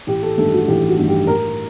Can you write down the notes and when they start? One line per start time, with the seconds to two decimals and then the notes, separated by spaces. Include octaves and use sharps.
0.07 A1 G4
0.23 A4
0.37 G2 D#3 A3 A4
0.53 F#4
0.68 A1 G4
0.88 F#4
0.98 G2 D#3 A3
1.08 G4
1.27 A2 A#4